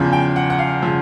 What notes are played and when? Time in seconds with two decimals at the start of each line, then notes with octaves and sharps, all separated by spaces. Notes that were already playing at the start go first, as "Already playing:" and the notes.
Already playing: E2 C#3 F3
0.13 G5
0.36 F#5
0.50 F#5
0.59 F5
0.82 C#3 F3